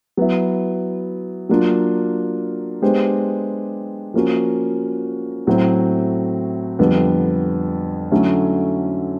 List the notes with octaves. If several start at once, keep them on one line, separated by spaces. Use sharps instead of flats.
F#3 B3 E4
F#3 A#3 D4 F4
G#3 B3 D4 G4 C5
F3 A#3 C#4 F#4
A2 F#3 A3 C4
F2 D3 G3 B3
D3 F#3 A3 C#4 E4